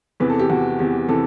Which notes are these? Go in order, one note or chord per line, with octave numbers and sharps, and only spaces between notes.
E2 C3 E3 B4
A4
G4
E2 C3 E3 F#4
E2 C3 E3 G4
C3 E3 A4